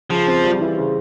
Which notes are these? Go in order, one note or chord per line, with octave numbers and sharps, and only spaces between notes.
C#3 F3
C4
G3
E3
C#3